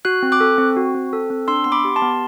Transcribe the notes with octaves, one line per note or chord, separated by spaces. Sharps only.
F#4 F#6
C4
D6 F#6
A4
C4
F#4
C4
A4
C4
D4 C6 E6
B3 C6
B5 D6
G4
A5 C6
B3